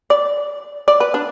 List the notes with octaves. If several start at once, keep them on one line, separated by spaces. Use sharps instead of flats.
D5
D5
B4
D4